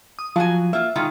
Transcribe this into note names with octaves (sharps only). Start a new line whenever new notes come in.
D#6
F3 F#3 F#4 G#5
A#3 F4 E5
D#3 G#3 F4